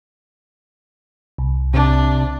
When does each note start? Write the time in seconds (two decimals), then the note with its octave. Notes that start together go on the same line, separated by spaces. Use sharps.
1.38 C2
1.74 C3 D4